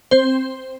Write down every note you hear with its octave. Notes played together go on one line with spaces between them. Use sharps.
C4 C5